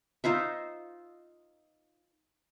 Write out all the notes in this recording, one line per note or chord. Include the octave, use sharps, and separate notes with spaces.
D#4 F4 C5 E5